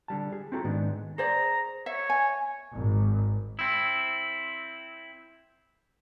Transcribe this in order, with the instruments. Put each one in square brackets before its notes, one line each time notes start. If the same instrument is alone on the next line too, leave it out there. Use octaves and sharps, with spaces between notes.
[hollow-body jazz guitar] D3 G3 A5
G#4
C4 E4 F#4 A4 A#5
G#2 D#3 G#3 B3 D4
[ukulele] G#4 C5 D5 [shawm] A#5
[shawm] C#5 [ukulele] E5
[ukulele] G#5
[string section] G#1
[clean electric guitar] C4 E4